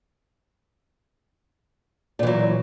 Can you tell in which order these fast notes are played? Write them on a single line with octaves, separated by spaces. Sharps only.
A#2 E3 F#3